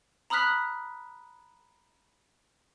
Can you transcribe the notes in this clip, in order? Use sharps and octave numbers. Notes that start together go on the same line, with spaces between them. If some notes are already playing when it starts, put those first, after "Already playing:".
A#5 B5 D#6 F6 F#6 B6